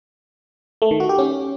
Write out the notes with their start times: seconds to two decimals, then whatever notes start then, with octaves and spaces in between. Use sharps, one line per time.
0.82 A3
0.91 D#3
1.00 F#4
1.09 G4
1.18 C#4